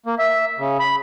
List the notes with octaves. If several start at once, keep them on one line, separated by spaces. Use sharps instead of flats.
A#3
E5
C#3
B5